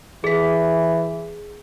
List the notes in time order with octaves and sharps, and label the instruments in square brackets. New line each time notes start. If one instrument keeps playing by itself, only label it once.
[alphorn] E3 [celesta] G#4 B6